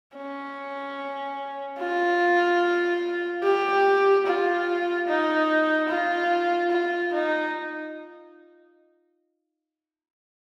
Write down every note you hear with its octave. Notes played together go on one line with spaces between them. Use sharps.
C#4
F4
G4
F4
D#4
F4
F4
D#4